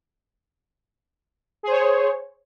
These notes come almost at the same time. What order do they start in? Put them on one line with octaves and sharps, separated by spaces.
G#4 C5 C#5